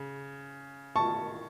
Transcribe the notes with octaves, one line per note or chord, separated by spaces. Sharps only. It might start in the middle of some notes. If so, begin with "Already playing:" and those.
Already playing: C#3
A5 C#6